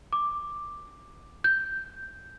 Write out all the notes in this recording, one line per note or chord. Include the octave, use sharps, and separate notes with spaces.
D6
G6